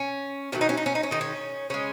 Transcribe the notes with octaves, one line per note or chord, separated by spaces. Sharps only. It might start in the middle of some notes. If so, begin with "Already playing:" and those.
Already playing: C#4
D#3 F#3 A3 C#4
D#4
C#4
D#4
C#4
D#4
C#4
D#3 G#3 D#4
C#4
C#3 G#3 C#4